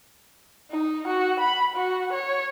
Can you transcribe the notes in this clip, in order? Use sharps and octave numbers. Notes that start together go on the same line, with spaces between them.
D#4
F#4
B5
F#4
C#5